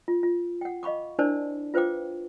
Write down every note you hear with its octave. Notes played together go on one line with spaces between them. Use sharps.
F4
F4
F#5 G5
D#5 F5 B5 C#6 D6
D4 E4 A#4 C5 D5 A5
F4 B4 C5 F5 G5 D6